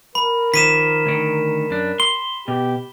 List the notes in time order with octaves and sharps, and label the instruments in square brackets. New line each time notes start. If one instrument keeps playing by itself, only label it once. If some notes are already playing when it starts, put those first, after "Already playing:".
[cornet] A#4 [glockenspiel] B5
[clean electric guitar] D#3 F3 [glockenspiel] B6 D#7 E7
[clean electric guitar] D2 D#3
F#2 D4
[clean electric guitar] C6 [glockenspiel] G7
[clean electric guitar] B2 [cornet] G4